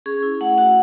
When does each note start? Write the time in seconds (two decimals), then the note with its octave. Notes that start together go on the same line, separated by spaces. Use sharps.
0.06 C#4 G#4
0.23 E4
0.41 A3 F#5
0.58 F#4 F#5